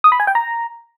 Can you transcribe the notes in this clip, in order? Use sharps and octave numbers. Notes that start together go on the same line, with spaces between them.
D#6
B5
G#5
G5
A#5